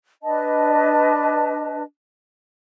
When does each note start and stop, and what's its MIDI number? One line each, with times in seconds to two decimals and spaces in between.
0.23 1.82 62
0.23 1.82 71
0.23 1.82 75
0.23 1.82 81